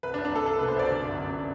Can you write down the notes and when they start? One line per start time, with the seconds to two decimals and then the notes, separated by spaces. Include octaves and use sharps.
0.03 C2 B4
0.14 D4
0.18 C2
0.25 D4
0.31 C2 A4
0.46 C2 A4
0.58 B2 B4
0.68 C5
0.76 C2 D5
0.90 D3
1.05 G1
1.19 F#2